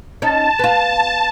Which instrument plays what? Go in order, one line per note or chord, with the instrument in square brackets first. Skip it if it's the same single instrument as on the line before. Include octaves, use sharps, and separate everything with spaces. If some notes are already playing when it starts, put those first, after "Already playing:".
[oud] C#4 D#4 [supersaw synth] A5
[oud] B3 F4